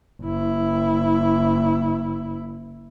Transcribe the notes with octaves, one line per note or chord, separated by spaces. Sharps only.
F#1 E4